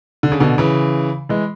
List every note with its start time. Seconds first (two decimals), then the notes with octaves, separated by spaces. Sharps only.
0.23 D3
0.32 C#3
0.40 B2 D3
0.58 C#3 E3
1.29 E3 G#3